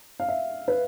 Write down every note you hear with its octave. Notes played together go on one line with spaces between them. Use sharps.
F5
E5
B4